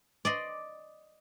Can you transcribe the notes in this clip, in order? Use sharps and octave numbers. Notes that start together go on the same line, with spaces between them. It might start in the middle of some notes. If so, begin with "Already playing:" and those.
D5 D#5 C6